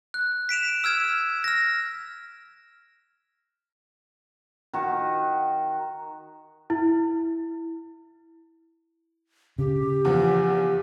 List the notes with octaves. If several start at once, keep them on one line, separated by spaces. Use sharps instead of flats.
F#6
B6 D7 E7 F7
E6 F6 G#6 E7
F6 A#6
D#3 F#4
E4
C#3 G4
E2 F3